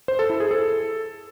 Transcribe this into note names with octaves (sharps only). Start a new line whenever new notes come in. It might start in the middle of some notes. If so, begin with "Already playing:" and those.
C5
A4
E4
G#4
A4